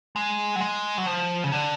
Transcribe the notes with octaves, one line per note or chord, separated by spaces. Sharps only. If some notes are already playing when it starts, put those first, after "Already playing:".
G#3
F#3
G#3
F#3
F3
C#3
D3